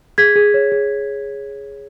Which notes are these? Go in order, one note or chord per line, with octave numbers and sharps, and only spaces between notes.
G#4 G#6 B6
G#4
C#5
G#4